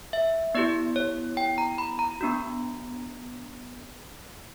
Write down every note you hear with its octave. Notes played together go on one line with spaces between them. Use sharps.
E5
B3 E4 G4 D5
C#5
G5
A#5
B5
A#5
B3 D4 F#4